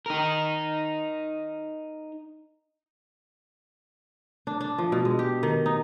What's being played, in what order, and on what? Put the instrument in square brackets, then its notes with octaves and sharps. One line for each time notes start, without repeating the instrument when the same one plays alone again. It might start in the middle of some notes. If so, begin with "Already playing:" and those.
[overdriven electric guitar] D#4 A#4
[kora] D4
D4
F3
B2
G#3
G4
D#3
D#4